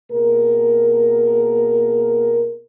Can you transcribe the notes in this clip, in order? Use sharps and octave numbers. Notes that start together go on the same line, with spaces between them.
B2 A#3 G#4 A#4